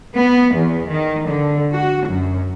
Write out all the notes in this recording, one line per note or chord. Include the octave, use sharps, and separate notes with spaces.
B3
E2
D#3
D3
F#4
F#2